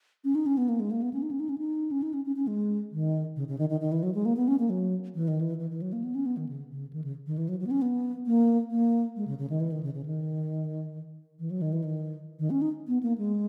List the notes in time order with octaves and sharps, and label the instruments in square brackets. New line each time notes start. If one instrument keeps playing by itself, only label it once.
[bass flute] C#4
D#4
C#4
B3
A#3
G#3
A#3
B3
C#4
D#4
C#4
D#4
C#4
D#4
C#4
D#4
C#4
C#4
C#4
G#3
D#3
C#3
C#3
D#3
D#3
D#3
E3
F#3
G#3
A#3
B3
C#4
A#3
F#3
E3
D#3
E3
E3
E3
F#3
A#3
B3
C#4
B3
D#3
C#3
C#3
D#3
C#3
D#3
E3
F#3
F#3
B3
C#4
B3
A#3
A#3
G#3
C#3
C#3
D#3
E3
D#3
C#3
C#3
D#3
E3
F#3
D#3
E3
D#3
D#3
C#4
D#4
B3
A#3
G#3